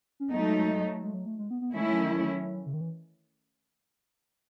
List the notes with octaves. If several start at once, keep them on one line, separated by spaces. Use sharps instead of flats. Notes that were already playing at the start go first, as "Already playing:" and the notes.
C#4
F#3 A3 B3 D#4
G#3
G#3
G#3
F#3
G#3
F#3
A3
G#3
B3
B3
D#3 G#3 A3 C#4 E4
F#3
F#3
C#3
D#3
E3